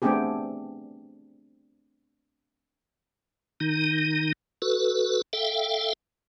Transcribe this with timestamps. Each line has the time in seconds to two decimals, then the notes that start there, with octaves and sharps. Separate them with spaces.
0.02 A3 B3 C4 D4 G4 G#4
3.60 D#3 D#4
4.62 F#4 A4 B4
5.33 A4 E5 F5 G5